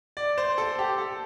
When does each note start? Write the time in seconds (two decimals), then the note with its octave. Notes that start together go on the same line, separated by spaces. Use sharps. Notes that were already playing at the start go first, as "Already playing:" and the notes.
0.17 D5
0.38 C5
0.58 A4
0.79 G4
0.98 A4